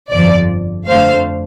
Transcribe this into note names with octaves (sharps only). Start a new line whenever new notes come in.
G1 F2 F3 D5
F2 D3 A3 C5 F5